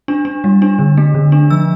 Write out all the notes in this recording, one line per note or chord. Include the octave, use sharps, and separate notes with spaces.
D4
D4
G3
D4
D3
A3
D3
D4
F3 E6